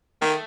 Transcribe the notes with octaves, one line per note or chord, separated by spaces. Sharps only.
D#3 A3